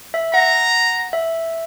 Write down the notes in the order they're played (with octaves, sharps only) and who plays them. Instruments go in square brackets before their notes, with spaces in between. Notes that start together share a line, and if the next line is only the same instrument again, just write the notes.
[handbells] E5
[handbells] F#5 [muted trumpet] A#5
[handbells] E5